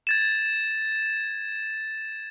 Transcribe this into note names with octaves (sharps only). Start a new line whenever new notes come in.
G#6 A6 E7